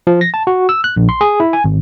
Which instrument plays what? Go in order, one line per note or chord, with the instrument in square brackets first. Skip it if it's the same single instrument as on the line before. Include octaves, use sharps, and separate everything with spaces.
[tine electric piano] F3
A#6
A5
F#4
E6
F#6
A#1
C6
G#4
E4
G#5
G#1